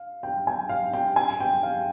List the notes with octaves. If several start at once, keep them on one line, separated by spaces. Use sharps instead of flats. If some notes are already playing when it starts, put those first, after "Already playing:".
Already playing: F5
G5
G#5
F5
G5
G#5
G5
F5